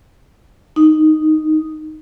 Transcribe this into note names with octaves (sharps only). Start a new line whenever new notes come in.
D#4